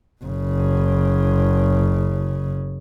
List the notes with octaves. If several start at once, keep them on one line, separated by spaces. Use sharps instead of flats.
F#1 C#3